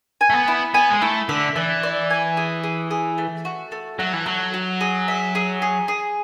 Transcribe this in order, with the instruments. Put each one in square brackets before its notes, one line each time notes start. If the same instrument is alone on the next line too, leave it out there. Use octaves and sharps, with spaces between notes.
[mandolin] G#5
[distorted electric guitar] A3
B3
[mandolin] E4
[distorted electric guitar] B3 [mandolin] G#5
[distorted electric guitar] G#3
[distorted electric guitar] A3 [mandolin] E4
[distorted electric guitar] D3 [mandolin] E5
[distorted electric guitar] E3 [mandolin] D5
[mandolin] D5
G#5
G#4
G#4
G#4
A3
F#4
A3
[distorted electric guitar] F#3 [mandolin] A3
[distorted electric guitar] E3
[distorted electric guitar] F#3 [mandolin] F#4
[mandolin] F#4
G#4
E5
G#4
G#4
G#4